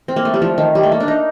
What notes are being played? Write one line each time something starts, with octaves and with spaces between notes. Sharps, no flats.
C4
A#3
A3
G3
F3
D#3
G3
A3
A#3
D4
D#4